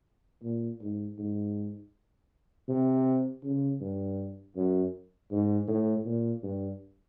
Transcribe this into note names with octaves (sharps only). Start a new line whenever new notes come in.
A#2
G#2
G#2
C3
C#3
G2
F#2
G#2
A2
A#2
G2